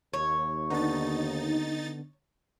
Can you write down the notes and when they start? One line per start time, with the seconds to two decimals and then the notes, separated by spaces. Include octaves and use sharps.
0.14 D#2 C#5
0.70 D3 B3 D4 D#4 A6